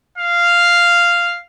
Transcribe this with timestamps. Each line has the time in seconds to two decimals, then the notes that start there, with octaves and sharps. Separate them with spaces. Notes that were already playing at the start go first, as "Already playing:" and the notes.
0.18 F5